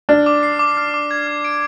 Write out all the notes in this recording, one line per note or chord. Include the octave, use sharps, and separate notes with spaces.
D4 F6
D6
C7
D6
F6
D6
G#6
F6
D7